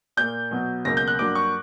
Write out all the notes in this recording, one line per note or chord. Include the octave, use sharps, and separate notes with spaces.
A#2 A#3 G6
B2 F#3 B3
C#2 B2 F#3 A#3 A#6
G6
F#6
G2 F#3 A#3 D6
C#6